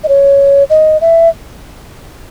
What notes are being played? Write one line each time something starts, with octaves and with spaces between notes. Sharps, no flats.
D#5
C#5
D#5
E5